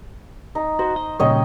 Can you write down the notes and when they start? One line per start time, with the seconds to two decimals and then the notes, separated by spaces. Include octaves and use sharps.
0.55 D#4
0.79 F#4 C5
0.96 D#5
1.19 A#2 C#3 G3 C#5 D#5 G5